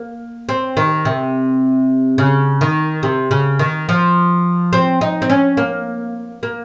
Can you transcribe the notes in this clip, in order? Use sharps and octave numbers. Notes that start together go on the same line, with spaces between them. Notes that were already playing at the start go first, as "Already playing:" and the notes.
Already playing: A#3
C4
D#3
C3
C#3
D#3
C3
C#3
D#3
F3
C4
D#4
C4
C#4
A#3
A#3